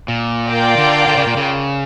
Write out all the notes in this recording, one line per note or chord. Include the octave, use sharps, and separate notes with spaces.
A#2
F4 A#4 D5 G5
D3
D3
C#3
A#2
C#3